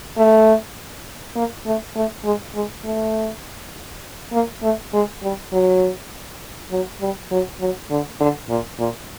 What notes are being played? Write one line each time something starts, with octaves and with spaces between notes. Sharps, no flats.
A3
A#3
A3
A3
G#3
G#3
A3
A#3
A3
G#3
G3
F#3
F#3
G3
F#3
F#3
D3
D3
A#2
A#2